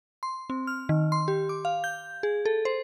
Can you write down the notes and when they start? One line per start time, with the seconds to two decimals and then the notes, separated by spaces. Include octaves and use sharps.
0.23 C6
0.50 C4
0.67 F6
0.89 D#3
1.12 C6
1.28 G4
1.49 D6
1.65 F5
1.84 G6
2.23 G#4
2.45 A4
2.65 C5